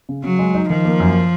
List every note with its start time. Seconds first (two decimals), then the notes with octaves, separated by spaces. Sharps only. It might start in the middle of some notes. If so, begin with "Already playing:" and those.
0.09 C#3
0.24 C#3 F#3
0.39 G#3
0.55 D#4
0.70 D#3 F3
0.85 A#3
1.00 F#2